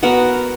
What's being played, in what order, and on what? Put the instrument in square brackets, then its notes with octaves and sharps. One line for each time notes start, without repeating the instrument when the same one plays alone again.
[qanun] B3 F#4 A#4